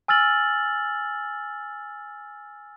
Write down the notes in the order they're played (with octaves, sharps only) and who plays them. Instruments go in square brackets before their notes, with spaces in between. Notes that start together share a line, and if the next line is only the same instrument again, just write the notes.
[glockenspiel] G#5 E6 F6 A6 F#7